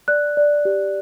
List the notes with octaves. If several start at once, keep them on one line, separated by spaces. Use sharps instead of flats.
D5 F#6
D5
G4